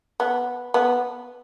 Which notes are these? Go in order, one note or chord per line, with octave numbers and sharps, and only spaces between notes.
B3
B3